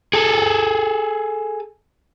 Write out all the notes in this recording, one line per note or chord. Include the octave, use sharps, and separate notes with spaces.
G#4 A4